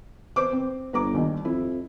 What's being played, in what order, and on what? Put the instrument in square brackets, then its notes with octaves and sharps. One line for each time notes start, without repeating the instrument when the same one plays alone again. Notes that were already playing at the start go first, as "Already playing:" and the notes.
[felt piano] B4 C5 D6
C4
[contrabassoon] G1 [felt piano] B4 A#5 D6
[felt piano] D#2 D#3 G3
[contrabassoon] F2 [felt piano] E4